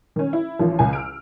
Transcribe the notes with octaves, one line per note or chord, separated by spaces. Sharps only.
D#3 C#4
E4
A1 D#3 F3
C#2 G#5
E6 F6 D7